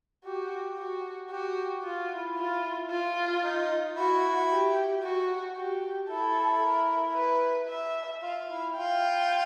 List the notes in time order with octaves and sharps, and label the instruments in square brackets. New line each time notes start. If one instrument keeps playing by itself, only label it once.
[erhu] F#4 [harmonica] G4
[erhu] F#4
[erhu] F#4 [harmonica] G4
[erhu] F4 [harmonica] F#4
[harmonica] E4
[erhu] F4
F4
[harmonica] D#4
[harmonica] E4 [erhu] F#4
[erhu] G4
F#4
G4
[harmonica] E4 [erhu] A4
[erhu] A#4
B4
E5
[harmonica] F4 [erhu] F5
[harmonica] E4
[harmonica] F4 [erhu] G5